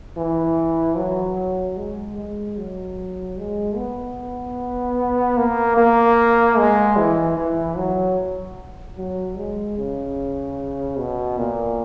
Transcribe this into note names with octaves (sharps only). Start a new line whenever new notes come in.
E3
F#3
G#3
G#3
F#3
G#3
B3
A#3
A#3
G#3
E3
E3
F#3
F#3
G#3
C#3
B2
A#2